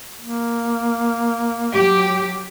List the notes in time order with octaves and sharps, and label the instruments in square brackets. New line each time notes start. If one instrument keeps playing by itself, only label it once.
[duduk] A#3
[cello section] F#3 G4